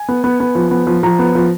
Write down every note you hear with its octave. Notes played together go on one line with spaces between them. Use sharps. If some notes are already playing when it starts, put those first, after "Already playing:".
Already playing: G#5
B3
B3
B3
F3
B3
F3
F3 A#5
B3
F3